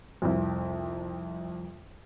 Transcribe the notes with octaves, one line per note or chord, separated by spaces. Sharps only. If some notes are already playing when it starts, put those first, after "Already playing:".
C2 F2